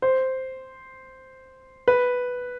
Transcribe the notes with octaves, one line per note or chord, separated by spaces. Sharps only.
C5
B4